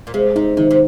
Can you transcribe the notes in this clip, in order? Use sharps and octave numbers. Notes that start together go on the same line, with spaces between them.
A#2
C3 G#3
C3 D#4
C3 D#3
C3